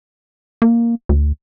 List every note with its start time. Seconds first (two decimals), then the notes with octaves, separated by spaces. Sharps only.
0.62 A#3
1.09 D2